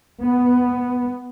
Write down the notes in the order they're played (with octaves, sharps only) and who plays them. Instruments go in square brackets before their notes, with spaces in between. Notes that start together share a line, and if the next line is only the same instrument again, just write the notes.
[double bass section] B3